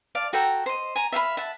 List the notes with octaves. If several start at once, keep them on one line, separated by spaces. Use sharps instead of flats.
D5 F5 A5
F#4 A4 G5 A#5
C5 D#5
G#5 A#5
E5 F5 G5 B5
E5 F#5 A5